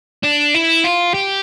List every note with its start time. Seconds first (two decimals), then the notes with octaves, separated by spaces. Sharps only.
0.23 D4
0.54 E4
0.84 F4
1.14 G4